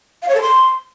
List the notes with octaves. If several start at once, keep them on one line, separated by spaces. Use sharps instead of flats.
F5
C#5
A4
C6